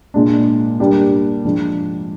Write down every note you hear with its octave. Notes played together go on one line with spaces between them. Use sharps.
A#2 G#3 D4
G3 A#3 D4 G4
F3 G#3 D4